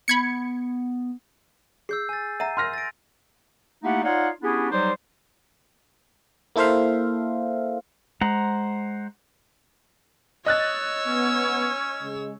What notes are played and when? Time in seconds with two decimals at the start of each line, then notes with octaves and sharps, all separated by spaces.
0.08 B3 B5 G#6 C#7
1.89 G#4 E6 G6 C7
2.09 G#5 A6
2.40 E5 F#5 A#5 D#7
2.57 C6 F6 A#6
2.74 A6 D7
3.83 A3 A#3 D#4 E4 G4 F#5
4.04 D#4 F4 C#5 D5 F5 F#5
4.42 B3 C#4 D4 E4 G4 G#4
4.70 F#3 G3 D#4 G4 C5
6.56 A#3 E4 A4 C5 E5 F5
8.21 G#3 C5 F#5 A#5
10.46 C#5 D#5 E6 F#6 A6
11.06 B3 C#4
12.02 C#3 G#3